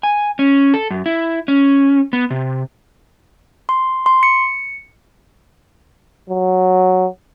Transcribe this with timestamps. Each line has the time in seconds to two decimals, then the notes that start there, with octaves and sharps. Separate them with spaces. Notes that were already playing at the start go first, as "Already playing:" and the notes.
0.03 G#5
0.39 C#4
0.74 A4
0.91 F#2
1.06 E4
1.48 C#4
2.13 B3
2.30 C3
3.69 C6
4.06 C6
4.23 C#7
6.29 F#3